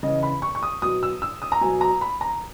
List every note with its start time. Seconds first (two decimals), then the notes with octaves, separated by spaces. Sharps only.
0.03 C#3 E3 D#5
0.23 B5
0.42 C#6
0.55 C#6
0.63 D#6
0.82 B2 F#3 D#6
1.03 E6
1.22 E6
1.42 D#6
1.52 A#5
1.61 B2 F#3 G#5
1.81 A#5
2.01 B5
2.21 A#5